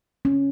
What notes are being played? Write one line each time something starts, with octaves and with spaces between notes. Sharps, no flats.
C#4